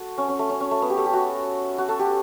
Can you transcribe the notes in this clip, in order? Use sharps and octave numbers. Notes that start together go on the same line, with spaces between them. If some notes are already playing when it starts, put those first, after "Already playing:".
Already playing: F#4 A4
C#4
C#4
A3
C#4
C#4
A3
B3
G4
A4
G4
F#4
F#4
A4
G4